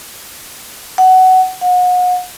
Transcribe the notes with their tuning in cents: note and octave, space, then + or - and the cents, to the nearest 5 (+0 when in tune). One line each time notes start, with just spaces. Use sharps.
F#5 +15
F#5 -35